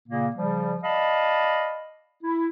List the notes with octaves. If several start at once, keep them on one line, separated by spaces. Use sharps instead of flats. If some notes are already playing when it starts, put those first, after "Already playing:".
A#2 C#3 A#3
C#3 F3 G3
D5 D#5 F5 A5 B5
E4